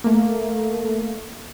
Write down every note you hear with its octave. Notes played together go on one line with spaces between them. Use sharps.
A3 A#3